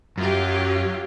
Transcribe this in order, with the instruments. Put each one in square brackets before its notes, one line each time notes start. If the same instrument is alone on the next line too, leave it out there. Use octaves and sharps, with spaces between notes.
[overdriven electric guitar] F#2 [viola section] F#3 F4 G4